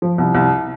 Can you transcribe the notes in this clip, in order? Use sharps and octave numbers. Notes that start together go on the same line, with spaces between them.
F3
C2
C2